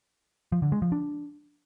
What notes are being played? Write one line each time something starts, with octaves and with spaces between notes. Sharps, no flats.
F3
D3
G#3
F3
D4